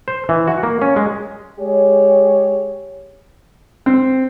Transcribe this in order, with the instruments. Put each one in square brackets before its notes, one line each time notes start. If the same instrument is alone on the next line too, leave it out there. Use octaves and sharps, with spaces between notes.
[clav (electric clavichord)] C5
E3
F#4
A#3
C#4
G#3
[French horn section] G#3 G4 G#4 C#5
[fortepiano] C4